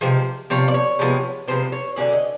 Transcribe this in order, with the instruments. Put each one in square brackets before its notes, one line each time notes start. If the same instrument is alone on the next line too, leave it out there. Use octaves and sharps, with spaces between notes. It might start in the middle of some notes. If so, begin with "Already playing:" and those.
[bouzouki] C3 F3 G#3 C5
C3 F3 C#5
D5
C#5
C3 F3 G#3 B3
C3 F3 G#3 B3 C5
C#5
D3 F#3 A#3 C#4 D5
D#5